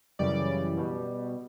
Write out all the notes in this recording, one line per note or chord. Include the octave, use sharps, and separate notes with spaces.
F#2 C#3 E3 G3 D5
B2 G3